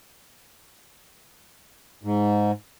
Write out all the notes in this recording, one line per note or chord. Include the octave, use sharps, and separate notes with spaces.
G#2